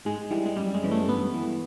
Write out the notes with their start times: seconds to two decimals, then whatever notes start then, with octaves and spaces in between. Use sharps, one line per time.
0.05 G#2 G#3
0.31 E3 G3
0.46 G#3
0.56 F#2 G3
0.74 G#3
0.83 C#3 E3
0.91 A3
1.08 G2 B3
1.34 E3